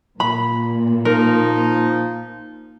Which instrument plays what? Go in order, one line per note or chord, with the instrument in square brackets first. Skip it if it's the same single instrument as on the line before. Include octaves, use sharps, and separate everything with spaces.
[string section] A#2 [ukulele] B5
[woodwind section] F3 D#4 [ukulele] A#4